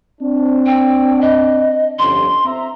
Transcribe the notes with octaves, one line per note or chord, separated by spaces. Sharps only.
C4 D4
G5
D#5
G1 F2 C#4 C6
C4 E5 A#5